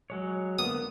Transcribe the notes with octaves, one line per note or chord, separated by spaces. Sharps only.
F#3 G#3 C#5
D3 A#3 B3 D#6